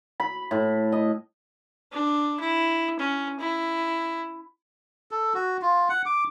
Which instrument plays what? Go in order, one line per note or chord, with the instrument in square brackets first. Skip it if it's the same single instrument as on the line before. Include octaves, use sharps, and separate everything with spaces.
[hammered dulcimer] B5
A2
D#5
[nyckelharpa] D4
E4
C#4
E4
[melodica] A4
F#4
F4
F#5
D6